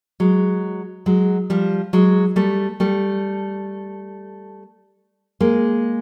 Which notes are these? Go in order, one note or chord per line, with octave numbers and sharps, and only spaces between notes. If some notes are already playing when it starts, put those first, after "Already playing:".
F#3 G#3
F#3 G#3
F3 G3
F#3 G#3
G3 A3
G3 A3
G#3 A#3